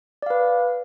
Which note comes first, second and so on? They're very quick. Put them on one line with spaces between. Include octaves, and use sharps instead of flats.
D5 F5 B4